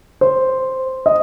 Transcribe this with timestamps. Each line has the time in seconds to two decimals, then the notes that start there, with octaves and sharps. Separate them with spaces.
0.21 C5
1.06 D#5